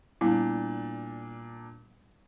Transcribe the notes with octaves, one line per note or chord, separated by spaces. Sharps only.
A#2 G3 B3 D4 E4